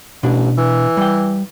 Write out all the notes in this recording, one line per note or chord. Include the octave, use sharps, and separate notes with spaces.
A1 B2 D4
E3
G3 G5